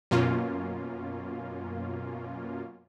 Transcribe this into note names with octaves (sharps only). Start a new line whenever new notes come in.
F#2 B2 A#3 C#4 F4